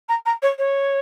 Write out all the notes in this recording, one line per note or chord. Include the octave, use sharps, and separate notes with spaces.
A#5
A#5
C#5
C#5